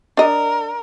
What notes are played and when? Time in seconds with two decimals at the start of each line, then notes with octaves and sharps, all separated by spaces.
0.17 D4 A#4 D#5